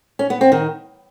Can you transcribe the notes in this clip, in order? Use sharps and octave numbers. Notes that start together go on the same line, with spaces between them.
C#4
B3
C4
D#3